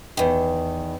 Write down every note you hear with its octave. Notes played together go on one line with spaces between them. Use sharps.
E2 D#3